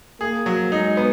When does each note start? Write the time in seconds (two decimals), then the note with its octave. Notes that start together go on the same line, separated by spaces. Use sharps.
0.20 A#3 G#4
0.46 F#3
0.72 G#3 D#4
0.97 B3